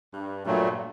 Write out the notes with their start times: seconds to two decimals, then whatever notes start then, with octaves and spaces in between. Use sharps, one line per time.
0.14 G2
0.46 G2 A#2 F#3 A3